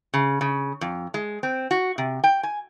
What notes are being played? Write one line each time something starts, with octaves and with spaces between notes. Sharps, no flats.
C#3
C#3
F2
G#3
C4
F#4
C3
G5
G#5